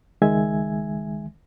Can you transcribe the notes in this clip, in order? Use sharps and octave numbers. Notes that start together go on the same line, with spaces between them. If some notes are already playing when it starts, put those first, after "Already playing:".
C#2 D#3 G#3 E5 G#5 G#6